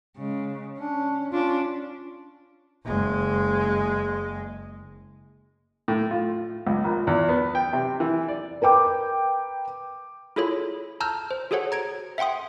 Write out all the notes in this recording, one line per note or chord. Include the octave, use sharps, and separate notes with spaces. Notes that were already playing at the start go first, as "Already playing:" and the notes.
C#3 G#3
C#4 D4
C#4 D4 F4
F#1 G#3
A2
F4
C#2
A#1
E2
B3
G5
C3
E3
D5
A#4 B4 G5 D6
E4 F4 G#4 A4 C#5 B5
A5 A#5 E6 F6 G6
C5
F#4 G#4 A4 C5 C#5 F#5
A#5 G#6 D7
E5 F#5 G5 C6 D#6